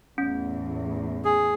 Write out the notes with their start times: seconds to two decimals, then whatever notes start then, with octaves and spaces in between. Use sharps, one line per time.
0.18 E2 A2 C#4
1.24 G#4